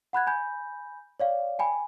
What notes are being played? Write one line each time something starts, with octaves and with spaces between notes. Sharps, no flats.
F#5 B5 F#6 G#6
G#5 B5 G6
C#5 D5 F5
G5 G#5 B5